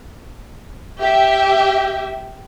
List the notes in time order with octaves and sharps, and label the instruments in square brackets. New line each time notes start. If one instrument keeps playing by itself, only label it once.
[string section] G4 E5